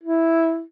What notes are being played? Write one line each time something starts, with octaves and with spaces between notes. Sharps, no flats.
E4